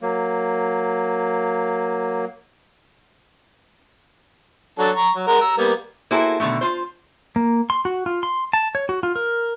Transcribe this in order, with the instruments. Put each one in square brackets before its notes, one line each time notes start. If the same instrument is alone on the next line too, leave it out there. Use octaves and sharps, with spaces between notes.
[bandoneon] F#3 A#3
[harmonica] F#3 D4 A4
A#5 C#6
F#3
G#3 A#4 F#5
A#5 E6
G3 A#3 B3
[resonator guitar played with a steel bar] A#3 E4 F#4 G#4 A4 C5
B2 D3 D#3 A3
F4 C5
[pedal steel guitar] A#3
C6
F#4
F4
C6
A5
C#5
F#4
F4
A#4